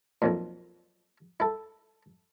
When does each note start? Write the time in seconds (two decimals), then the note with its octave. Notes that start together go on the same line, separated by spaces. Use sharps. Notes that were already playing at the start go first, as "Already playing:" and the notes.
0.22 B1 F2 A#2
1.40 E4 A4